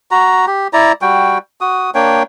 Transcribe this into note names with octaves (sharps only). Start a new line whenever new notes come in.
F#4 A#5
G4
E4 D5 A#5
G3 F#4 G5
F#4 D#6
A#3 D4 C#5 G5